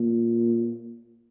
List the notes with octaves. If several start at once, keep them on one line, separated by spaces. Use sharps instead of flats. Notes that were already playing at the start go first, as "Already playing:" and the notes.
Already playing: A#2